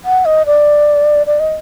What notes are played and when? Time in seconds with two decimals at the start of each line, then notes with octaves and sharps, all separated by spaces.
0.05 F#5
0.25 D#5
0.46 D5
1.27 D5
1.40 D#5